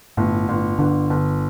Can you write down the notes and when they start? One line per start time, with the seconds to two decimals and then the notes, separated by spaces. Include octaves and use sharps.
0.17 G1 A2
0.49 G1
0.79 G1 D3
1.10 G1